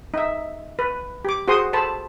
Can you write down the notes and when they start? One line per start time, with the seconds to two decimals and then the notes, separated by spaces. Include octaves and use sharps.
0.14 D#4 E5
0.79 B4
1.25 G4 D6
1.48 F#4 G#4 C5 F#5 C6 D#6
1.73 A4 C5 A5 B5